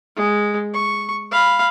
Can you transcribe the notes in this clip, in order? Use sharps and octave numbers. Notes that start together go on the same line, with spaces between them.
G#3
C#6
F5 B5